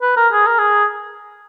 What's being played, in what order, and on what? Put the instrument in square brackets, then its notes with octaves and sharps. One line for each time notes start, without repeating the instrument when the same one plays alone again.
[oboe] B4
A#4
G#4
A#4
G#4